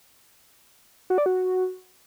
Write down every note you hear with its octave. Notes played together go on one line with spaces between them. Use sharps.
F#4
D5
F#4